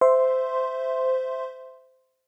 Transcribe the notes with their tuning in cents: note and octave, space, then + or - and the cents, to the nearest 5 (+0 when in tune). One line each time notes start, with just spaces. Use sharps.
C5 -15 E5 +0 C6 +0